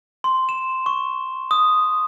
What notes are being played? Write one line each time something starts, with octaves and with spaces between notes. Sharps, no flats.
C6
E7
C#6
D#6